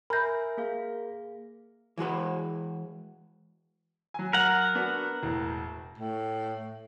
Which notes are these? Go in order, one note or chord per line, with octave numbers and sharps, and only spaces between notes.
A#4 E5 G#5 B5 G6 A#6
A#3 G#4 F5
E3 G#3 F#4 B4
F#3 G#5
A#4 F#5
B3 D4 F#4
E1 A2
A2